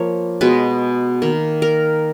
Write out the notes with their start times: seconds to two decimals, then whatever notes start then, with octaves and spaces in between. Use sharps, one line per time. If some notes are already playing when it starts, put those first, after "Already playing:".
Already playing: F3 A#3 C#5
0.41 B2 G#3 B3 B4
1.22 D#3 A#3
1.62 A#4